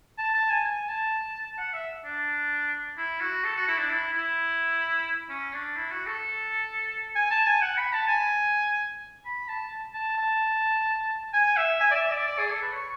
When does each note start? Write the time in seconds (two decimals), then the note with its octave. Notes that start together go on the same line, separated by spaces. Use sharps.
0.18 A5
0.34 A5
0.50 G#5
0.65 G#5
0.89 A5
1.58 F#5
1.73 E5
2.05 D4
2.97 E4
3.20 F#4
3.44 A4
3.56 F#4
3.68 E4
3.78 D4
3.90 E4
4.13 E4
5.30 C#4
5.53 D4
5.76 E4
5.91 F#4
6.07 A4
7.16 G#5
7.31 A5
7.46 G#5
7.62 F#5
7.78 B5
7.93 A5
8.08 G#5
9.25 B5
9.48 A5
9.94 A5
10.17 A5
11.34 G#5
11.57 E5
11.81 G#5
11.91 D5
11.95 E5
12.11 D5
12.27 D5
12.39 G#4
12.50 A4
12.62 B4
12.73 C#5